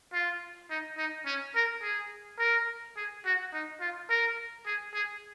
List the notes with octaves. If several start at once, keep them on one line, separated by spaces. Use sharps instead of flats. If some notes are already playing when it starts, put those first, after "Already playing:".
F4
D#4
D#4
C#4
A#4
G#4
A#4
G#4
F#4
D#4
F4
A#4
G#4
G#4